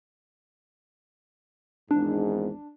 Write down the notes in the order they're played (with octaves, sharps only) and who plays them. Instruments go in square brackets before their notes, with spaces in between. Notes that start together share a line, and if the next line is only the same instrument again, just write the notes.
[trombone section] G#1 E2 G#2 [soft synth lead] D4